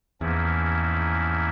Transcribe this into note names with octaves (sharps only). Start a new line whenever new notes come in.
E2 G#2 F3 A#3 C#4 E4